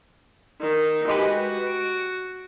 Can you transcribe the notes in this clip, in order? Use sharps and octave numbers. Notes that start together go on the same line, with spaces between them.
D#3
G#3 F#4 G4 B4
D7